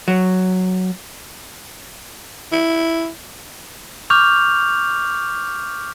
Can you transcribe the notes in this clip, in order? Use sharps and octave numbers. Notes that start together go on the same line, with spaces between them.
F#3
E4
C#6 D6 F6 G6 F7